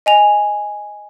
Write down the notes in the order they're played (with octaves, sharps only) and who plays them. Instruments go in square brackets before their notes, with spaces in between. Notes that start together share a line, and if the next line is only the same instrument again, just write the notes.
[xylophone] D#5 G#5 F7